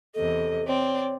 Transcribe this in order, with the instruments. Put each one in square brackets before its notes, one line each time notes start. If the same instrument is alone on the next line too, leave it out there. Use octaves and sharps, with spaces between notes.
[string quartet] E2 C3 D#5 [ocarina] A4
[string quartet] C4 D5 [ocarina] C#5